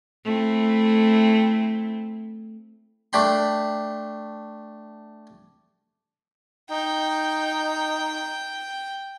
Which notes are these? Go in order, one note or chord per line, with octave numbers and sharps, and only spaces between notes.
A3 C4 E4
A3 D4 G5 B5 C6
D#4 G5